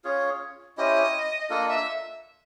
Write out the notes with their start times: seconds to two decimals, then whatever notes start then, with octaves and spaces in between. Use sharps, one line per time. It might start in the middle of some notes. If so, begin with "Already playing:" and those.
0.04 C#4 F4 G#4 C#5
0.77 C#4 E4 G4 C5 D#5
1.49 A#3 D4 F4 A4 D#5
1.69 E5